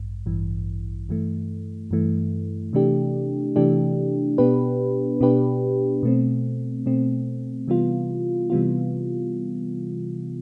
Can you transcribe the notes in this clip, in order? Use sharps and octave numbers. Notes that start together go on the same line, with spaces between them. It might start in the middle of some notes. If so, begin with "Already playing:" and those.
Already playing: A1 G2
A1 G2 E3
G2 E3 A3
G2 E3 A3
C3 E3 A3 D4 G4
C3 E3 A3 D4 G4
B2 B3 D4 G4 B4
B2 B3 D4 G4 B4
B2 A3 C4
B2 A3 C4
C3 E3 G3 B3 F4
C3 E3 G3 B3 F4